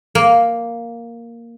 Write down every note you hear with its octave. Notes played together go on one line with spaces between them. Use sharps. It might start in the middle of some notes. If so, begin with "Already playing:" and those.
A#3